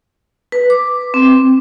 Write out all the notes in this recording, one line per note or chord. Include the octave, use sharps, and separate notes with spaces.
B4
D6
C4